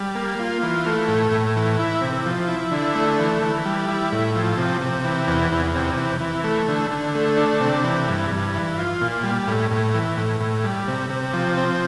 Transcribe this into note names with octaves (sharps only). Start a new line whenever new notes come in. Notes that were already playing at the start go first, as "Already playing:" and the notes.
Already playing: G3
A#3
F4
E3
A3
A2
A2
E3
E4
C3
F3
E4
D3
A3
E3
E3
G3
E4
A2
F3
C3
C3
E3
E2
E2
C3
E3
E3
A3
D3
D3
A3
D4
C3
E3
G2
G2
E3
F4
A#2
G3
A2
A2
E3
A2
A2
G3
C3
C3
F3
C4